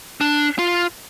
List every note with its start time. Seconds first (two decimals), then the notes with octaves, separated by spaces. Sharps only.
0.21 D4
0.59 F4